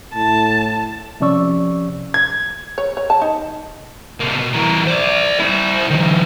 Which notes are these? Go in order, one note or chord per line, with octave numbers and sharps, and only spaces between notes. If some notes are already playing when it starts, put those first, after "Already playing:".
A2 A5
C3 F3 C#4 D5 C#6 E6
G#6
C#5
C#5
A5
D#4
C3 A#3
B2
E3 A#4
C5 D5
E4 C5
D#3 F3